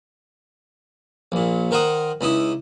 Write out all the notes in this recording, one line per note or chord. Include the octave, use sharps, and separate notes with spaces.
A#1 A#2
D#3 A#4 C5 F#5 D#6
C#2 D#4 E4 D#6